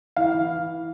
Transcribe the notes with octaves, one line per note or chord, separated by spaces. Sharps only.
E3 F5
E3